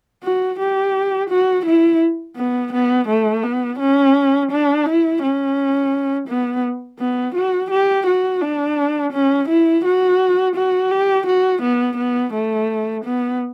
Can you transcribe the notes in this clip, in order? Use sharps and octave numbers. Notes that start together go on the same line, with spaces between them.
F#4
G4
F#4
E4
B3
B3
A3
B3
C#4
D4
E4
C#4
B3
B3
F#4
G4
F#4
D4
C#4
E4
F#4
F#4
G4
F#4
B3
B3
A3
B3